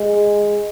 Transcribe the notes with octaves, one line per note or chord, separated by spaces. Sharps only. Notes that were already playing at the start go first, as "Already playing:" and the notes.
Already playing: G#3